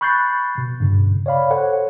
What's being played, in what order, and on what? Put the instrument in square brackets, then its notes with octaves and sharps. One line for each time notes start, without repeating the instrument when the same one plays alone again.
[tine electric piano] B5 C#6 F#6 G6 A6 C7
B2
G2 C#3
C#5 D5 F5 B5
A4 C5 C#5 F#5